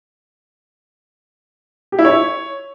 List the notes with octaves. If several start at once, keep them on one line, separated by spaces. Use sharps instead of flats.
G4
E4
C#5